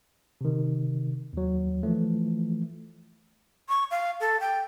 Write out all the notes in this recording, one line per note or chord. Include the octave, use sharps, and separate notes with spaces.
C3 D#3
D#2 F#3
E3 F3 A3
C#6
F5
A4
G5